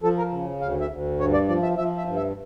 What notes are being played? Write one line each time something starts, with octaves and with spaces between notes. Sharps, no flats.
F3 A4
A#4
C#3
D2 F5
E5
D2
G2 C#5
D5
F3 D5
E5
F3 E5
E5
G2
E5